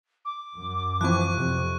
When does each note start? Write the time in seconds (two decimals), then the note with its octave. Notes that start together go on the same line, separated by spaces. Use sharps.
0.25 D6
0.57 F#2
1.01 E3 F3 C4 C#6 F#6
1.32 F2 C3